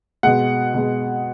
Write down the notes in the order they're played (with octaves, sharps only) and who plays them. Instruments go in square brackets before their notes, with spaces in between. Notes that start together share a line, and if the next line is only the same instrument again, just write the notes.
[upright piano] B2 G#3 F#5
B2 G#3